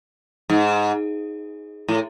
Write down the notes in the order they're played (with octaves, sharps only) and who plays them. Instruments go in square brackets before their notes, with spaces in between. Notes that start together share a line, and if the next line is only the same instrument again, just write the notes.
[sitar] G#2
A2